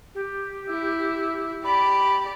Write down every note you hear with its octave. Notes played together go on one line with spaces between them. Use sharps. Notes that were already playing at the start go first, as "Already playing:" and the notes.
G4
E4
G4 D5 B5